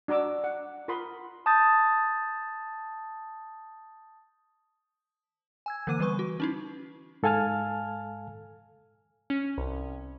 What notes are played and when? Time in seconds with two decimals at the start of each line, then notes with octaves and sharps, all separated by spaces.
0.08 D4 F#4 A#5 D6 E6
0.44 F#5
0.88 F4 A#4 F#5 B5 C6 D#6
1.46 A5 D#6 G6 A6
5.66 G#5 E6 G#6
5.87 D3 E3 A#3 D6 D#7
5.99 E3 G3 B3 B4 C#6
6.19 F#4
6.40 C#4 D#4 E4
7.23 G#2 A4 F5 G#5 A5 F6
9.30 C#4
9.58 C2